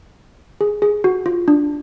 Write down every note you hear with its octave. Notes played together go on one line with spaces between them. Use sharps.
G#4
G#4
F#4
F4
D4